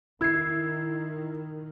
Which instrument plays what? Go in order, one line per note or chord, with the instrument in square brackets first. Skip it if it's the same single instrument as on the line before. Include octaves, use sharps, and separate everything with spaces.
[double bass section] D#3 [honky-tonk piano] E4 C7 [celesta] E6 G#6